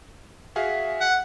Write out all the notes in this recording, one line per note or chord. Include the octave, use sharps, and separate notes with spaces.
F#4 G#4 E5 F5
F#5